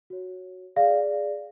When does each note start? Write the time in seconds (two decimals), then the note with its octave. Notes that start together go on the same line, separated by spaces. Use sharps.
0.10 F#4 C#5
0.76 G#4 D5 F5